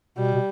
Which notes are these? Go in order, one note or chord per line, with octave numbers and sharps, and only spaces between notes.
B2 G3
B2